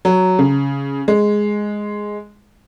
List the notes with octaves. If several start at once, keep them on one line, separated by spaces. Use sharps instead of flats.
F#3
C#3
G#3